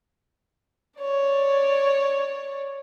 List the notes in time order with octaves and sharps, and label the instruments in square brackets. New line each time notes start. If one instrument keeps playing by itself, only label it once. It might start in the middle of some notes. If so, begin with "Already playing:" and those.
[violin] C#5 D5